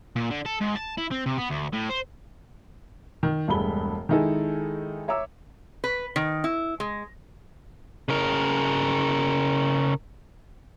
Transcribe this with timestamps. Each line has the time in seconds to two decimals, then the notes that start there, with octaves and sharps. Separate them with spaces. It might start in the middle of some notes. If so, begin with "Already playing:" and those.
0.16 A#2
0.30 D3
0.45 A4
0.60 G#2
0.75 A5
0.98 E4
1.11 C4
1.26 C3
1.38 B3
1.50 D2
1.73 A2
1.89 C5
3.23 D#3
3.48 E1 G2 G#3 A3 B5 G7
4.09 D#3 G#3 D#4 E4 G#4 A4
5.08 C#5 E5 A#5 D6 E6
5.84 B4
6.16 D#3
6.44 E4
6.80 G#3
8.09 C#3 A#4